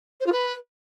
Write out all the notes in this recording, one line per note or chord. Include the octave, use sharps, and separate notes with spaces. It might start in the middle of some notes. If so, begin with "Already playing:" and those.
C5
F4
B4